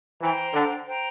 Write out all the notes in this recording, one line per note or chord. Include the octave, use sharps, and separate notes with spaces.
E3 C5 G5 A#5
D3
C5 G5 A#5